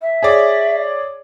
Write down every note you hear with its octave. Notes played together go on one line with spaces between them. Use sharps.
E5
G#4 C#5 D5